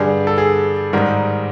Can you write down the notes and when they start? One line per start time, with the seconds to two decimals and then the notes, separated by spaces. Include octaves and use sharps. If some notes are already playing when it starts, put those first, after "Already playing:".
Already playing: G2 D3 G3 G#4
0.27 A4
0.38 G#4
0.93 G#2 D#3 G3 A#4